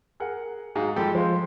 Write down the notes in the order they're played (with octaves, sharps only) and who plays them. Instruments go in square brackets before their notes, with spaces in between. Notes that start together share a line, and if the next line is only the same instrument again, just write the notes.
[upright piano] G#4 A#4 F#5
[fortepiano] G#2 [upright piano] F#4 G#4 F5
[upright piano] F3 G#3 [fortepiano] G3 G4 A4
[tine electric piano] F3 [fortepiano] G#3 [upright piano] C5 F5 C6